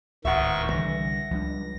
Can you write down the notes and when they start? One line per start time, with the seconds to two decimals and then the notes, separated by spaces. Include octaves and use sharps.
0.25 D1 C#2 G#2 D#3 E5 F#5 C#6
0.70 C2 D3 E3 G3 A#6
1.31 C#2 F3 G3 D4